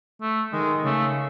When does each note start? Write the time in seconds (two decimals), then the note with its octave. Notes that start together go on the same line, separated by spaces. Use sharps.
0.21 A3
0.52 D#3 G#3
0.84 C#3 A3